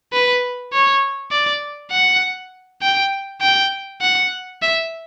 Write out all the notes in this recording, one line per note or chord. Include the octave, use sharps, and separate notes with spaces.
B4
C#5
D5
F#5
G5
G5
F#5
E5